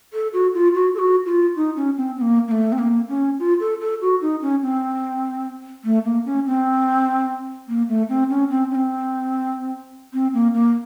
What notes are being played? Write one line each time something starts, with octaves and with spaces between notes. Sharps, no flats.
A4
F#4
F4
F#4
A4
F#4
F4
D#4
C#4
C4
C4
A#3
A#3
A3
C4
A#3
C#4
F4
A4
A4
F#4
D#4
C#4
C4
A3
A#3
C#4
C4
A#3
A3
C4
C#4
C4
C#4
C4
C4
A#3
A#3